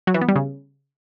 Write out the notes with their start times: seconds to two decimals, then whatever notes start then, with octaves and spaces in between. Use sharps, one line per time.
0.07 F#3
0.14 E3
0.21 B3
0.29 G3
0.36 C#3